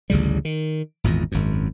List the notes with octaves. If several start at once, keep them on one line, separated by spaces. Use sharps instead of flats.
A1 D2 C#3 G3
D#3
G#1 E2 A#2
G#1 F#2